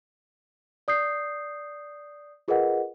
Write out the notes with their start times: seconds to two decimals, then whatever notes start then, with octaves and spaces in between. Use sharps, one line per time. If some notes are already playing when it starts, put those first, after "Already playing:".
0.88 D5 D#6 G6 C7
2.48 F4 G#4 A#4 B4 D#5 F#5